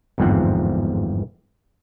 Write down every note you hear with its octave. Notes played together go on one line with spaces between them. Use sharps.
G1 E2 G#2 F3 C4 F#5